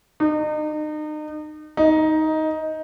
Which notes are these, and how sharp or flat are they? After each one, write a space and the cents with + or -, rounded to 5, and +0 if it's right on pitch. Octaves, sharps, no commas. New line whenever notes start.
D#4 -35
D#4 +10